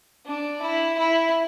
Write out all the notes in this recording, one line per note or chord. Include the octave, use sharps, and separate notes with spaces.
D4
E4
E4